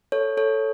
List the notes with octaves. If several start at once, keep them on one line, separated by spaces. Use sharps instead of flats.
A4 C#5
A4 C#5